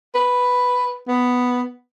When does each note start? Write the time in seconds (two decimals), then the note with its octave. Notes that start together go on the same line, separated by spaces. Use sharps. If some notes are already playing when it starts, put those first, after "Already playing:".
0.15 B4
1.08 B3